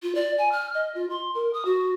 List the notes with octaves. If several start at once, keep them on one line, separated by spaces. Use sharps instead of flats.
F4
D5
G#5
F6
D#5
F4
C6
A#4
D#6
F#4